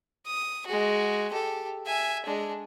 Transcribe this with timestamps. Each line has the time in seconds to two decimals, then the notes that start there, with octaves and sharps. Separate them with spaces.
0.26 D#6
0.67 G#3 F#4
1.32 G4 A4
1.86 E5 G#5
2.25 G#3 D4